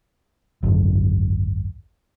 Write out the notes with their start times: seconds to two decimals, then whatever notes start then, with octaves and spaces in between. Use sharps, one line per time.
0.63 G#1 C#2 F#2 D3